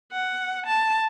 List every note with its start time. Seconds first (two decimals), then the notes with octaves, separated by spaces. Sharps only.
0.12 F#5
0.66 A5